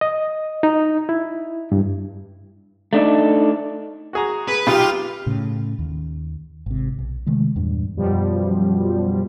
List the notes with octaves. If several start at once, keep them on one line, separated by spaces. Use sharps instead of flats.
D#5
D#4
E4
G2
A3 D4 D#4
F#4 G#4 A#5
G#4 B4
B1 D#4 F4 G4 B5
A2 C#3
D#2
G#1 C3
B1
C3 D#3 G#3 A3
E2 G2 A#2
F#2 B2 F3 G3